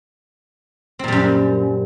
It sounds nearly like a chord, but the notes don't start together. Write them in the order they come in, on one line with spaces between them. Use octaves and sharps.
C4 A#2 G3 F#2